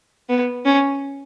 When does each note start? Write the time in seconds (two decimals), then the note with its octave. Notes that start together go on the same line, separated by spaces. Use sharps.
0.29 B3
0.65 C#4